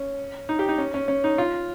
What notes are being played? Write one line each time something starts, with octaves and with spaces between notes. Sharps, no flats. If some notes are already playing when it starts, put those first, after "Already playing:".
Already playing: C#4
D#4
G4
D#4
C#4
C#4
C#4
D#4
F4